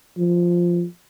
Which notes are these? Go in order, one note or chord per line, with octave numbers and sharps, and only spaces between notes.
F3